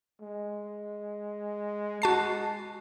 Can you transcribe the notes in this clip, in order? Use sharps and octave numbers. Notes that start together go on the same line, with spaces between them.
G#3
G#3 F#4 A5 C7